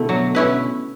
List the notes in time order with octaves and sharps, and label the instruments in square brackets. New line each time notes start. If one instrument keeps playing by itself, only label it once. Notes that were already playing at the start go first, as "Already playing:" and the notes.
Already playing: [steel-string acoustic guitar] B2 D3 [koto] A3 E4
[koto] F#3
C#4 E4 B4